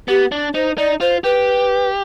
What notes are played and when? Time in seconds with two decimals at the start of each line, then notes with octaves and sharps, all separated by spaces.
0.08 B3 G4
0.32 D4
0.54 D#4 C5
0.77 D#4 D5
1.00 F4 C5
1.24 G4 B4